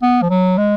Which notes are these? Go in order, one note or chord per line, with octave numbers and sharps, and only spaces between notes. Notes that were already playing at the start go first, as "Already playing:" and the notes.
B3
F3
F#3
G#3